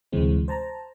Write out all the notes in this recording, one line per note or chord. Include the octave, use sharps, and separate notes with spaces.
D2 A2 C3 E3 G#3 C4
C5 A5 A#5